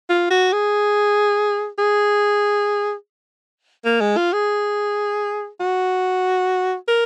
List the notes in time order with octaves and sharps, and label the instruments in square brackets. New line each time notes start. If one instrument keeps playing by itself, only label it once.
[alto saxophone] F4
F#4
G#4
G#4
A#3
G#3
F4
G#4
F#4
A#4